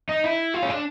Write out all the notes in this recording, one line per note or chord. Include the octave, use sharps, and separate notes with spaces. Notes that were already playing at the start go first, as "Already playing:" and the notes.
D#4
E4
F4
C#4
D4